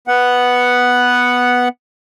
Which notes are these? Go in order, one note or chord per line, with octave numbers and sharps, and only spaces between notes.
B3 F#5